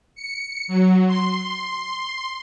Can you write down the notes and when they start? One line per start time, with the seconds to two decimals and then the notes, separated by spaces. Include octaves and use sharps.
0.15 C#7
0.68 F#3
1.07 C6